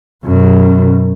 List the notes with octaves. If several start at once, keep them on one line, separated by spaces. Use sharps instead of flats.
F#2 B2